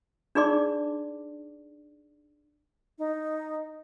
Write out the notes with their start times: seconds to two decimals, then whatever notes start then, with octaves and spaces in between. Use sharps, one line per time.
0.35 D4 D#4 G#4 D5 C6 D6
2.98 D#4